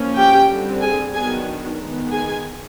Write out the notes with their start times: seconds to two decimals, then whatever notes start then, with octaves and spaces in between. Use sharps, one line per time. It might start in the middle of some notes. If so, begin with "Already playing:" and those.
Already playing: F3 A#3 C#4
0.16 G4 G5
0.49 D3 G3 C4
0.81 G#4 G#5
1.14 D#3 F#3 B3 D4 G#4 G#5
1.79 D#3 G#3 B3
2.11 G#4 G#5